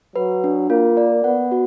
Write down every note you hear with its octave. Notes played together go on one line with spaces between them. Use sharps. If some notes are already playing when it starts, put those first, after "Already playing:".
F#3 B4
D4
A#3 F4
D5
B3 F#5
F#4